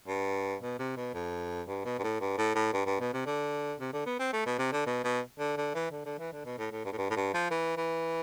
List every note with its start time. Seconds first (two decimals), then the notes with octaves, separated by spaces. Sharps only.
0.08 G2
0.62 B2
0.79 C3
0.97 B2
1.14 F2
1.67 G2
1.85 B2
1.99 G2
2.03 A2
2.21 G2
2.38 A2
2.55 A2
2.73 G2
2.86 G2
3.00 B2
3.14 C3
3.26 D3
3.80 C3
3.93 D3
4.06 B3
4.20 C4
4.33 A3
4.46 B2
4.59 C3
4.72 D3
4.86 B2
5.04 B2
5.39 D3
5.57 D3
5.74 E3
5.91 D3
6.06 D3
6.19 E3
6.32 D3
6.45 B2
6.58 A2
6.72 A2
6.85 G2
6.92 A2
6.98 G2
7.10 A2
7.16 G2
7.34 F3
7.51 E3
7.77 E3